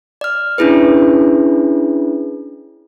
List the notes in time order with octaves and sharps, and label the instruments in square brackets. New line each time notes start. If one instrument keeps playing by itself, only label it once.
[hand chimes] D5 F6
C#4 D4 E4 G#4 B4